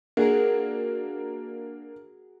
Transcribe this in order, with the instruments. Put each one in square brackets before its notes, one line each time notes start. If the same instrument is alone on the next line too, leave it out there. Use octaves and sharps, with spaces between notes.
[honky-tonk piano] A#3 D4 [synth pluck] F#4 G#4 A#4